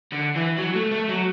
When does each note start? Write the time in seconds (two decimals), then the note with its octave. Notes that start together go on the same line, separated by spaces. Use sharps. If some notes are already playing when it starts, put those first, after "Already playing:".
0.12 D3
0.35 E3
0.58 F#3
0.75 A3
0.91 A3
1.09 F#3